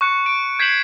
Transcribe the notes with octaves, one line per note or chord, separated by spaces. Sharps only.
C#6 F#6 C#7
D7
G6 G#6 B6 C7 E7 F#7